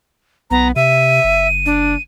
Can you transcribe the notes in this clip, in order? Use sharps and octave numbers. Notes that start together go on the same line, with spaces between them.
B1 B3 A#5
C3 E5 D#7
F#1
D4